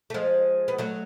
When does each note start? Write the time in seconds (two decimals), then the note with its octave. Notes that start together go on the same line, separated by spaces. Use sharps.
0.10 A3
0.14 F3 G#3
0.68 B3
0.78 F#3 A3